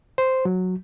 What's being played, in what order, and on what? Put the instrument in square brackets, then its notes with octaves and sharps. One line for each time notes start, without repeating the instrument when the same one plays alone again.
[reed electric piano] C5
F#3